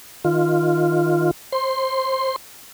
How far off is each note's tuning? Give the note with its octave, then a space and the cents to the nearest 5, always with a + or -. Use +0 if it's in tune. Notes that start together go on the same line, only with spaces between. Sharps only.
D#3 +0 F4 +0
C5 +20 C6 +0